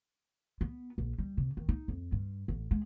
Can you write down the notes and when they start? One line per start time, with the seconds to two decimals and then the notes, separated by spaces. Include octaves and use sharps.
0.61 B3
0.98 A#1
1.18 G3
1.37 C3
1.57 D#3
1.69 D#4
1.88 F2
2.12 G2
2.48 A1
2.71 G#3